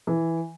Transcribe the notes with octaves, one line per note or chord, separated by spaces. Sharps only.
E3